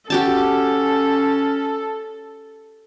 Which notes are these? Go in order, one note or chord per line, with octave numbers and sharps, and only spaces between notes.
C#4 F#4 G4 A4 A5